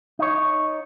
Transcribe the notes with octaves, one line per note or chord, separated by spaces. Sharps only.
D#4 C#5